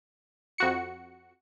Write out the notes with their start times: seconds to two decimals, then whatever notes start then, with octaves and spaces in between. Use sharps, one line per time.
0.58 F2 F#4 C#7